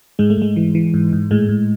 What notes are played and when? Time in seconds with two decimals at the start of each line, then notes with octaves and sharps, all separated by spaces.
0.19 G#2 G#3
0.30 A3
0.37 G#2 G#3
0.56 E3
0.75 E3
0.94 G#2
1.13 G#2
1.31 A2 G#3
1.49 A2